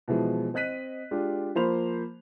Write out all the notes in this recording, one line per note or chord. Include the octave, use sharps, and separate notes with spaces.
B2 E3 F3 G#3
C4 D#5 F#6 B6 D#7
G#3 D4 F4 G4
F3 A#3 C5 B5 F7